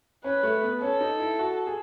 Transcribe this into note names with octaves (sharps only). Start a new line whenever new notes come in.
C#4 B4
A3
B3
C#4 A4
D#4
E4
F#4
G#4